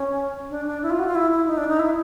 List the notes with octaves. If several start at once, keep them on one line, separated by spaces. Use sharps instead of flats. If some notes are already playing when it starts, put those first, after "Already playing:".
Already playing: C#4
D4
D4
E4
F4
F#4
F4
E4
E4
D#4
D4
D#4
E4